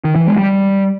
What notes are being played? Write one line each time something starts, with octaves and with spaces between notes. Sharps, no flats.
D#3
E3
G#3
G3